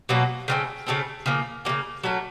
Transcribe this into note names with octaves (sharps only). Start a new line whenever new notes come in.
B2 F#3 A#3
C#3 F#3 A3 C4
C#3 F#3 A3 C4
C#3 F3 A#3
C#3 F3 A#3
F#3 A3 C#4